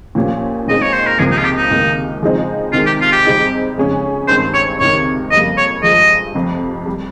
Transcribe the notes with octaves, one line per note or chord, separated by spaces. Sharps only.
A#2 F3 A#3 C#4 G4
A#2 G#3 C4 D#4 D#5
C#5
C5
A#4
C#2 C3 F3 A#3 G#4
D#4
F4
G4
D#4
C#2 C3 D#3 A#3
C#3 F3 G#3 C4 D#4
C3 D#3 G#3 F4
G4
F4
G4
C3 G3 C4 D#4 G#4
F2 C#3 G#3 C#4 G#4
G2 D#3 G#3 C4 C5
C#5
C#2 C3 D#3 C#5
F2 C#3 G3 A#3 D#5
C#5
G2 F3 G#3 D#5
F1 F2 C3
G3